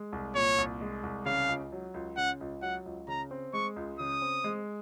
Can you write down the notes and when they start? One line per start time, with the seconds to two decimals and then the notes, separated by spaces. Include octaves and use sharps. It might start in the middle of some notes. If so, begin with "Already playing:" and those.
Already playing: G#3
0.12 C2
0.35 A#2 C#5
0.58 C2
0.81 G#3
1.03 C2
1.26 C#3 F5
1.49 C#2
1.72 F#3
1.94 C#2
2.17 C#3 F#5
2.41 C#2
2.62 F#3 F#5
2.86 C#2
3.08 C#3 A#5
3.31 C4
3.53 G#3 C#6
3.76 C#2
3.99 C#3 D#6
4.22 C4
4.44 G#3